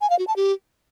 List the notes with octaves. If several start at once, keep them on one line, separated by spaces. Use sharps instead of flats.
G#5
F5
F#4
A5
G4